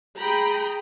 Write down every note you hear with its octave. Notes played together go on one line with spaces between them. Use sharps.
G#4 G5 A#5 B5